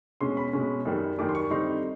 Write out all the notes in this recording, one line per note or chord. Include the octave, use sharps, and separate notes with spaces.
B2 G#3 C#4 C6
B5
B2 G#3 C#4 B5
F#2 D#3 G3
F#2 D#3 G3 D6
C6
C#6
D3 G3 C4 D#4 C6